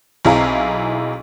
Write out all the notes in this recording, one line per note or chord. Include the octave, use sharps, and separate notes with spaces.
B1 C4 E4 G#4 F5 A#5